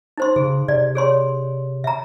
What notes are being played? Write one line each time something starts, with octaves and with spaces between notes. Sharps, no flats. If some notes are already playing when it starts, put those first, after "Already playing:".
D#4 C5 C6
C#3 G#4
C3 D5
G#4 C#5 C6
E5 A#5